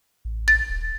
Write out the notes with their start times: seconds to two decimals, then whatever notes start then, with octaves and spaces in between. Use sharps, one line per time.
0.25 A1
0.48 A6
0.70 D#1